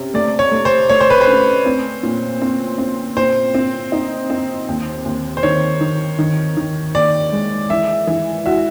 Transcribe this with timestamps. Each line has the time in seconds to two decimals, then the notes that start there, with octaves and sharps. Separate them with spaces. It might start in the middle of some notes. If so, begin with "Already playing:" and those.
Already playing: C3 C#4
0.14 A3 D5
0.39 C#5
0.51 A3
0.65 C5
0.89 A3 C#5
1.00 C5
1.10 B4
1.21 C5
1.27 C#4
1.66 C4
2.03 A#2
2.42 C4
2.78 C4
3.16 A#2 C5
3.54 C4
3.92 D#4
4.30 C4
4.68 D#2
5.06 D#2
5.37 C5
5.43 D#3 C#5
5.81 D#3
6.18 D#3
6.57 D#3
6.94 D#2 D5
7.32 G#3
7.70 E3 E5
8.07 E3
8.46 F#4 E5